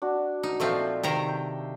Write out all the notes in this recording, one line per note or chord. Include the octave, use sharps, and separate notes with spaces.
D4 F#4
D#4
A#2 F3 A3 C4 E5 F5
C3 D#3 A#5
G5